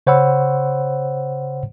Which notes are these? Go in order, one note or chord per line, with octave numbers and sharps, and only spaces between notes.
C#3 C5 C#5 F#5 B5 E6